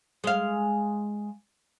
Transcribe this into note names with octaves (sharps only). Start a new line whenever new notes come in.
G#3 F5